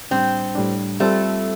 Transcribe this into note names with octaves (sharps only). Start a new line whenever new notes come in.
A2 G3 C4 D4
A2 G3 D4
G3 A3 C4 F4 A4